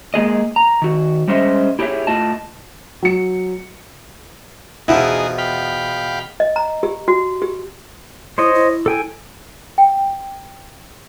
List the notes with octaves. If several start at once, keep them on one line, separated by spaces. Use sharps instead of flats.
G#3 A#3 G#4 D#5
A#5
D#3 F#4
G3 G#3 C#4 C5 D#5 E5
E4 G4 G#4 C#5 E5
A2 A3 F4 D#5 A5
F#3 C#7
E2 B2 F3 D#4 E4 G#4
F5 G5 B5
D#5
A#5
G4
F#4
G4
E4 C5 C#5 D#5
E4
A4 G5 G#5
G5